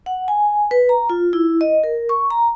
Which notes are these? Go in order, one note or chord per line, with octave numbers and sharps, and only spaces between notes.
F#5
G#5
B4
A#5
F4
E4
D#5
A#4
C#6
A#5